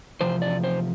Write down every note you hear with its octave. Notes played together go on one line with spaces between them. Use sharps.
E2 C3 F3 C5
D5
C5